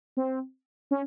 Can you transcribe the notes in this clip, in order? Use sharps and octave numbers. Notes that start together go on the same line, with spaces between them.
C4
C#4